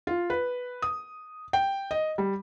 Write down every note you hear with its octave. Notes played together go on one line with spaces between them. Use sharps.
F4
B4
D#6
G5
D#5
G3